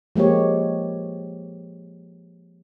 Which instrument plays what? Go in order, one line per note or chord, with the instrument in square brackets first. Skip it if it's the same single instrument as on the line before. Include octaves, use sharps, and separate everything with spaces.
[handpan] F3 G#3 A#3 G4 C#5